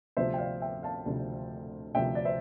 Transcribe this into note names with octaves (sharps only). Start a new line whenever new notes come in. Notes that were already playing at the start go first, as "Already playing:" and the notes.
D2 C3 F3 C5 E5
G5
D5 F5
E5 G5
F5 A5
D2 C3 F3
D2 C3 F3 E5 G5
D5
C5 E5